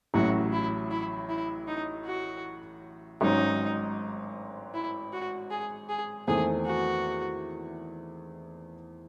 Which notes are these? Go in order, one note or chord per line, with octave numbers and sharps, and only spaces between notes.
A1 A2 F#3 C#4 F#4
E4
E4
E4
D#4
F#4
G#1 G#2 F#3 C#4 D#4
E4
F#4
G#4
G#4
E2 D#3 A3 C4 G#4
F#4